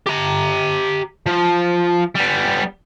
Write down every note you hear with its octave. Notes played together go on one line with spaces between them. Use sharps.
G4 A#5
F3
G3 B3